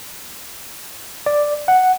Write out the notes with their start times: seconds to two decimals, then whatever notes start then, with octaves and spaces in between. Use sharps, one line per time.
1.26 D5
1.68 F#5